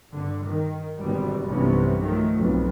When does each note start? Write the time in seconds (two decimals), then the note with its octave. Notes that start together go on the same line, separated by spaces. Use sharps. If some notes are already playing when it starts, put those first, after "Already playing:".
0.12 G2 D3
0.46 D#3
0.97 G#1 B2 D3 G3
1.46 B1 G2 C3 E3 B3 C#4
2.01 D#3 F3 F#3 A3
2.35 B1 F2 B2